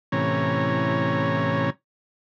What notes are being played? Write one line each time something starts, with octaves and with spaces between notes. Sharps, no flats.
A2 C3 E3 C#4 C#5 A#5